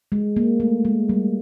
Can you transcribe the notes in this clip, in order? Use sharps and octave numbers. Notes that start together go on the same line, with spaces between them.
G#3
A#3
A3
G#3
G3